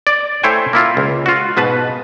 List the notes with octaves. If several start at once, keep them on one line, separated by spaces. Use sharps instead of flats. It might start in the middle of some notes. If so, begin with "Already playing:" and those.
D5
A3 E4 C5 C#5 G5 G#5
A#3 E4 F4
C#2
F4 F#4
G#2 B2 B4 A5